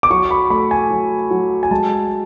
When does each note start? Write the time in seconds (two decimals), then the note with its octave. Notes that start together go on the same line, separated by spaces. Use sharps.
0.03 D6
0.10 F#3 C#6
0.31 B5
0.50 A3 B5
0.71 G#5
0.90 F#3
1.31 F#3
1.63 G#5
1.71 G#3 A5